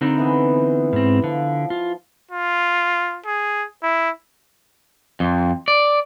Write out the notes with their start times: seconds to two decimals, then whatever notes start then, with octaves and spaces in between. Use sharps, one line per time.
0.01 D3 C4 D#4 A#5 B5
0.18 E3 B3 G#5
0.93 G#2 C4
1.24 D3 F3
1.70 F4
2.31 F4
3.26 G#4
3.83 E4
5.20 F2
5.68 D5